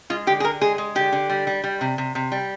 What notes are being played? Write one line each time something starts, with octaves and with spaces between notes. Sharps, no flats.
G#3 F4
D3 G4
G#4
D3 A#4
G#3 G#4
G#3
D3 G4
D3
G3
G3
G3
C3
C3
C3
G3